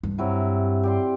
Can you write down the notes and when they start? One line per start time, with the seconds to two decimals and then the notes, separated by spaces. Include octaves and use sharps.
0.03 G2
0.18 C3 F#3 E4
0.83 G4 D5 C6